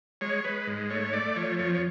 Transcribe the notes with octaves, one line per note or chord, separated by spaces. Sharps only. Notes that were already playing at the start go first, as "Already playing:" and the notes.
G#3 C#5
G#3 B4
G#2
A3 C#5
A3 D5
F3 C#5
F2 C#5
C#5